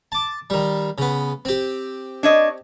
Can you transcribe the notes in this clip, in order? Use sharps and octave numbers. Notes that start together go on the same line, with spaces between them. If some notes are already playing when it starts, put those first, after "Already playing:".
A5 D6
D#3 G3
C#3 B3
C4 G4
D4 C#5 D#5